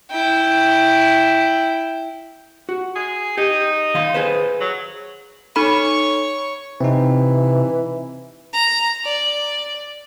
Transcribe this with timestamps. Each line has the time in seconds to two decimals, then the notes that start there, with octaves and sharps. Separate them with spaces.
0.11 E4 G5
2.69 F#4
2.96 G#4
3.37 D#4 G4
3.94 D#3 F5 C6
4.14 G#4 B4 C5
4.61 F#3
5.56 D#4 A4 C#5 B5 C#6
6.81 C3 E3 C4 D#4
8.53 A#5
9.05 D5